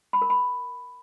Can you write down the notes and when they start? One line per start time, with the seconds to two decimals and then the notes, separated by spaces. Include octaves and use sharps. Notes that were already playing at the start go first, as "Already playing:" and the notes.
0.13 B5
0.22 A#4
0.30 B5